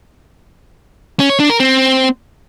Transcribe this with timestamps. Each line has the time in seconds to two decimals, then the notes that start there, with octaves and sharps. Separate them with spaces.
1.19 C#4
1.30 C#5
1.40 D4
1.50 A#4
1.60 C4